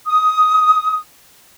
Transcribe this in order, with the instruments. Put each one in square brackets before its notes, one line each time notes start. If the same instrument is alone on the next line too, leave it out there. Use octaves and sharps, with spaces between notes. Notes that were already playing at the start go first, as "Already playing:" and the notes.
[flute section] D#6